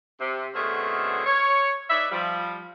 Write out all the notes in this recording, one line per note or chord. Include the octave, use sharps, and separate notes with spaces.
C3
B2 D3 A3 C4 C#4 G#4
C#5
D#4 B4 D5 E5
F3 G3